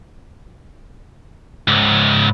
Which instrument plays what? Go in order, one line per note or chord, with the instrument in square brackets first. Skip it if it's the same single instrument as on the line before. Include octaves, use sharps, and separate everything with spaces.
[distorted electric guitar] C#2 G#2